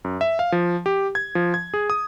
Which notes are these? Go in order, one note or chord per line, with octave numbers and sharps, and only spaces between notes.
F#2
E5
F5
F3
G4
G#6
F3
G#6
G#4
D#6